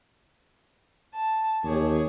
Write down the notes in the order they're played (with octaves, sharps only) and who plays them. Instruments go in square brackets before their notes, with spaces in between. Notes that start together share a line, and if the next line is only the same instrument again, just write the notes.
[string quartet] A5
[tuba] D#2 [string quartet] G4 G#4 C#5